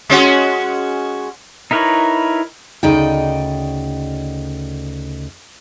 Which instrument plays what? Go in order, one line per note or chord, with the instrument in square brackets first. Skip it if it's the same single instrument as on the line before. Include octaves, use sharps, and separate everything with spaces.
[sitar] G#3 C#4 F#4
[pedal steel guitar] D#4 E4 A#4 B4 C#5
[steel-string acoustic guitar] D2 C#3 D#4 D5 D#5 G5